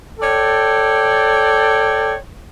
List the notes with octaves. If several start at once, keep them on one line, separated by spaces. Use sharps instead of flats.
A4 C#5 D5 G5